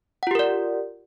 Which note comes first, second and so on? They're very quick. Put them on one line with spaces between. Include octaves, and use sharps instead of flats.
F#5 F4 G4 A#4 D5